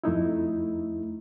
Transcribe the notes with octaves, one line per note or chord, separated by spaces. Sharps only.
F2 A3 D#4 E4